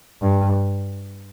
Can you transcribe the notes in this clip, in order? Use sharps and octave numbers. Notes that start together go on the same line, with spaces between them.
G2